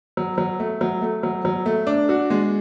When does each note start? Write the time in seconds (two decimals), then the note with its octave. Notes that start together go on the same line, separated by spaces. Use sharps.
0.17 F#3
0.38 F#3
0.60 A3
0.81 F#3
1.02 A3
1.23 F#3
1.45 F#3
1.66 A3
1.87 D4
2.09 F#4
2.30 G#3